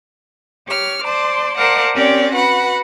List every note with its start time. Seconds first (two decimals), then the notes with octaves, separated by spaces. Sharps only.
0.68 G4 C#5 F6
1.04 C5 D5 A5 C6
1.57 A#4 C5 D5 F5 F#5 A5
1.95 C4 C#4 G4 A#4 C#5 D5
2.33 F#4 B4 F#5 B5